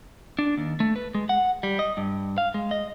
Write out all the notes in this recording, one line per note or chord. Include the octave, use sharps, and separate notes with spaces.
D4
D#2
A3
B4
G#3
F#5
G3
D#5
G2
F5
G#3
D#5